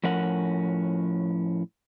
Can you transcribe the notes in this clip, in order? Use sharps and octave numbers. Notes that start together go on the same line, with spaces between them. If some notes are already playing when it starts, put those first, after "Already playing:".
A2 F3 C#4 A#4 F#5